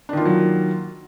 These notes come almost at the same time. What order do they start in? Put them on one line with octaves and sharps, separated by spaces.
D4 D#3 F4 A#3 F#3